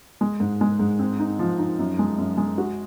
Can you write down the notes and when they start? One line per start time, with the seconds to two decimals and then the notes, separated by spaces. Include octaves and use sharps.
0.21 G#3
0.40 G#2
0.61 G#3
0.79 G#2
0.99 C4
1.19 D#4
1.39 F3
1.58 D#4
1.79 F#2
1.99 G#3
2.18 F#2
2.37 G#3
2.58 F#4